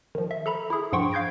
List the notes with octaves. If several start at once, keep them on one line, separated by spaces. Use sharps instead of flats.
D#3 F3
E5
A4 A#5 B5
E4 G#4
G2 F3 F#5 G5 C6 C#6
F5 G6 G#6 A#6 D7